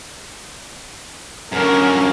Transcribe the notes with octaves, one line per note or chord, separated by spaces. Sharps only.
F#2 D3 C#4 A#4